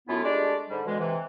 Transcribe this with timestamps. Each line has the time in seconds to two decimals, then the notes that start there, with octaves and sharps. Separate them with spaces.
0.08 F#2 A3 B3 E4 F4
0.24 G#3 A3 D4 G4 D5
0.70 G#2 D3 G3
0.86 B2 D3 E3 G#3
0.99 C3 E3